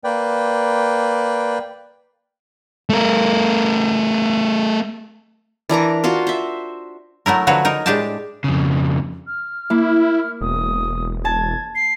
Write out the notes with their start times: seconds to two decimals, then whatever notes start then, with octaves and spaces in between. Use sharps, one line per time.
0.04 A#3 B4 D5 G5
2.90 A3 A#4
5.69 E3 D4 A#4 A#5
6.04 F4 F#4 C5 F5
6.27 C5 E5
7.26 F#3 A3 E4 A#4
7.47 D3 F3 F#3 F#4 B4 C#5
7.65 D#4 A#4
7.86 A2 G#3 D4 G4 G5 A5
8.44 F2 C#3
9.27 F6
9.70 A#3 E4
10.41 E1 D#6
11.25 A5 G#6
11.75 C7